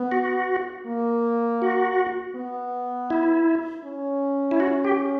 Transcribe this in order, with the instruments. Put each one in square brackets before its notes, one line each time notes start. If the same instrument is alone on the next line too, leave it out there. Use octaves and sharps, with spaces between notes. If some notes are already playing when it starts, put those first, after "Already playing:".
Already playing: [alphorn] B3
[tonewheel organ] F#4
[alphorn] A#3
[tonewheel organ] F#4
[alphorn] B3
[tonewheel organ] E4
[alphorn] C#4
[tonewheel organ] E4
F#4
G4